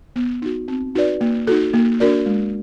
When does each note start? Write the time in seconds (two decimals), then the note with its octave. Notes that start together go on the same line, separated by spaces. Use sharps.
0.16 B3
0.42 D#4 F#4
0.68 C4
0.95 D#4 F#4 B4 D5
1.21 A#3
1.47 D#4 F#4 A4
1.74 A#3
2.00 D4 F#4 A#4 D5
2.26 G#3